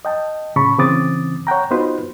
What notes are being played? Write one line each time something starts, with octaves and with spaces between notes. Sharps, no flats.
D#5 G5 A5
A2 C#3 A5 B5 C#6
C#3 E3 C4 D6 D#6 A6
C#5 F#5 G5 A#5
B3 D#4 F4 F#4 B4 C5